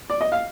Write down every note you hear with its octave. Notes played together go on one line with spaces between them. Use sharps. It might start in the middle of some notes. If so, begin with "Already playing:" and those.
D5
D#5
F5